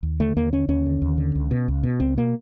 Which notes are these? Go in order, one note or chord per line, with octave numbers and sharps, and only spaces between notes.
D#2
D3 A3
D#2 A#3
D3 C#4
D#2 C#4
D3
D#2
D3
C#2
B2
C#2
B2
C#2 C4
B2 A#3